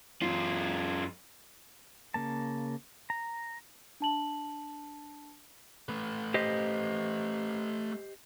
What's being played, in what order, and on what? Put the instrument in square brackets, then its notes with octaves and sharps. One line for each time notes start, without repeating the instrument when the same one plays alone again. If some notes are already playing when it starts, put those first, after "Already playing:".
[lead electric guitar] F#2 F4
[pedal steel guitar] C#3 A#3 A5
A#5
[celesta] D4 A5 F#7
[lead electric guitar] A3 B4
[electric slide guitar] G4 C5 D#5